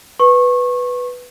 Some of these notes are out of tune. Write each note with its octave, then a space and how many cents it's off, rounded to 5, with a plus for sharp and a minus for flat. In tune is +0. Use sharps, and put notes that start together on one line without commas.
B4 +0 C#6 -25